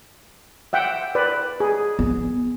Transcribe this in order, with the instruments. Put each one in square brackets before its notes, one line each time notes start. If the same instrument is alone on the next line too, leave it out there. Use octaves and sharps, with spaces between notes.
[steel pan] E5 F#5 G5
B4 D5
G#4
[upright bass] B3